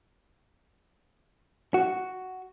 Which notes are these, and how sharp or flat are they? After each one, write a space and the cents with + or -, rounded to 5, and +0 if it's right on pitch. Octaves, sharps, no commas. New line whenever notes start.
F#4 +5